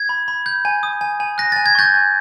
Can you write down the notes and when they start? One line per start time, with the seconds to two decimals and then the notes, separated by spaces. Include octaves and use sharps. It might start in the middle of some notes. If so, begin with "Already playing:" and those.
Already playing: G#6
0.09 B5
0.28 B5
0.46 G6
0.65 G#5
0.83 D#6
1.01 G#5
1.20 G#5
1.38 F#6 A#6
1.52 G#5 A6
1.66 G#6
1.75 C#6 G6 A6
1.94 G#5